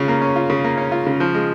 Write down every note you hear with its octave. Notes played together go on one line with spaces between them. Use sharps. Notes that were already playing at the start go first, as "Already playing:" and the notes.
Already playing: C#3 C#4 F4
A#3
C#4
F4
C#3
A#3
C#4
F4
C#3
F3
G#3